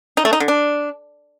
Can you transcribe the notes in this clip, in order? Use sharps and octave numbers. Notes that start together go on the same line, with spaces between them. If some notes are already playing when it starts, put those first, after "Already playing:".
D#4
A3
D#4
D3
D4